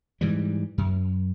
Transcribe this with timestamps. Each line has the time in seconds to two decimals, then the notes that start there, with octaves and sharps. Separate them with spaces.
0.21 G#2 E3 G3
0.78 F#2